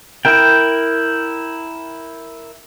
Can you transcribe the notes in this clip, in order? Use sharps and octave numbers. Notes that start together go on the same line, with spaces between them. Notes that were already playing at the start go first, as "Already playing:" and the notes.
E4 A#4 G5